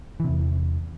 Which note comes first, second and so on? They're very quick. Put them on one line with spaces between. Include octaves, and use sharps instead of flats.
E3 C3 E2